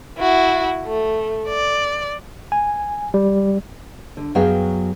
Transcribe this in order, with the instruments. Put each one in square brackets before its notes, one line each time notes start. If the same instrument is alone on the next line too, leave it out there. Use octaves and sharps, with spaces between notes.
[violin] E4 F#4
A3
D5
[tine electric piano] G#5
G3
[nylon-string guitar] D3
F#2 F#3 B3 G#4 F5 G5